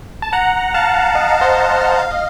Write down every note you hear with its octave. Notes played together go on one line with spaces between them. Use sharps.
A5
F#5 A#5
F5 A5
D#5
F5
C5 D#5
F5
D#5